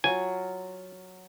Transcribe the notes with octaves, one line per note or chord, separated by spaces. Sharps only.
F#3 F4 G#5